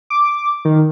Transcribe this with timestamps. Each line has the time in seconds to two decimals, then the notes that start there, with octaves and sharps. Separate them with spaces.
0.10 D6
0.65 D#3